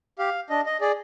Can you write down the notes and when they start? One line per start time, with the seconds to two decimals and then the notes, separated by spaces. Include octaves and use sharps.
0.19 G4 F5
0.50 D4 D#5
0.66 D#5
0.81 G#4 D5